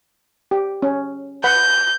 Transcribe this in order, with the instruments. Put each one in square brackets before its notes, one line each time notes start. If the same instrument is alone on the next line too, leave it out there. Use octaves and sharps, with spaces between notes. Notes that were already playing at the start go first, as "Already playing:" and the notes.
[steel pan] G4
C#4
[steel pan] B4 F#5 B5 [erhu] G6